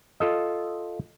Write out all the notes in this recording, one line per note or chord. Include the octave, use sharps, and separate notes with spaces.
F4 A4 D#5